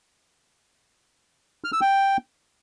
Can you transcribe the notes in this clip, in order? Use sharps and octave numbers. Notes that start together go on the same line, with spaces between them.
F6
E6
G5